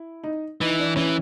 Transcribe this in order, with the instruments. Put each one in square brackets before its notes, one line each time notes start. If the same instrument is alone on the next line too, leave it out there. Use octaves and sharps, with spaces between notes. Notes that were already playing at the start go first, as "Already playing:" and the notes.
Already playing: [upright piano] E4
D#4
[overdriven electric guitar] E3 [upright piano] D#4
[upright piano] D4
[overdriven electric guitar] E3 [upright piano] C#4